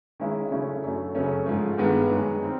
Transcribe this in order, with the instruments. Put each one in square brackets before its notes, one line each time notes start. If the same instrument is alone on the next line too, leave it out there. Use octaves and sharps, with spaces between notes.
[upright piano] D#3 G#3 C#4 E4
C#3 F#3 A3 C#4 E4
F#2 D3 F#3 A3
F#2 C#3 F#3 A3 C#4
G#2 F3 A3
G2 D#3 G#3 B3
F#2 D#3 G#3
G3 C4 D#4